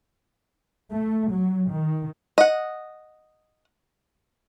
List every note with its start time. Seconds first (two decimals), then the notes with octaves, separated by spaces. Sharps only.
0.91 A3
1.31 F#3
1.72 D#3
2.38 D#5 F#5